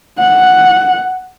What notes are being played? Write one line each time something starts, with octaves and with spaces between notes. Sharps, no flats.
F#5